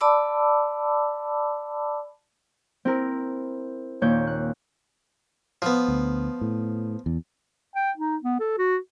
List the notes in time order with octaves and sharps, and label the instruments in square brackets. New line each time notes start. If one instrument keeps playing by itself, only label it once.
[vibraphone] D5 A5 B5 D6 E6
[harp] C4 E4 A#4
D#2 A#2 C#5 G6
F#6
[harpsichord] F3 B3
[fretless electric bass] D2
A2
E2
[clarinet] G5
D#4
B3
A4
F#4